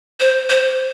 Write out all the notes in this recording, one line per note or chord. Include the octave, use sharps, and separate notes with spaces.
C5
C5